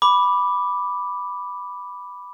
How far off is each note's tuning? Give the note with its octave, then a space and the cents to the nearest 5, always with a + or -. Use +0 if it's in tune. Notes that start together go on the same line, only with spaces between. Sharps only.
B5 +0 D6 +0